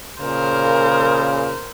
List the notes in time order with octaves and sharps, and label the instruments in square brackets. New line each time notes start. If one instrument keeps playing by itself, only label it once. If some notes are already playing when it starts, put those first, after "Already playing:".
[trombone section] A#2 C#3 [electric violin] A#4 C5